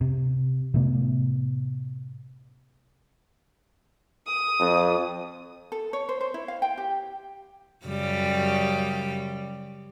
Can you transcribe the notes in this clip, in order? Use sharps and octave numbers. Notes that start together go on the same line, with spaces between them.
C3
A2 C3 A3 B3
D#6
F2
A4
C#5
C5
C5
E4
F5
G5
G4
F#2 C#3 G3